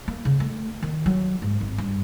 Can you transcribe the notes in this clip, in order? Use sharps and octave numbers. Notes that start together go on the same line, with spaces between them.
A#3
C#3
A3
D#3
F#3
G#2
G#1
G2